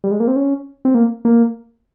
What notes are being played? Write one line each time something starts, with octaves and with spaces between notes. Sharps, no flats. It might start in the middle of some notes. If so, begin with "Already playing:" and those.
G3
G#3
A#3
C4
C#4
C4
A#3
A#3